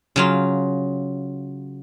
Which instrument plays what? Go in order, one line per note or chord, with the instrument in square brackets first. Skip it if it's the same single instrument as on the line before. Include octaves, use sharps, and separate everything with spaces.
[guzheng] C#3 F#3 F4